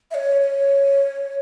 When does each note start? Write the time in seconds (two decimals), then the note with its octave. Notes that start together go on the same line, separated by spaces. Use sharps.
0.11 E5
0.14 C#5
0.41 C#5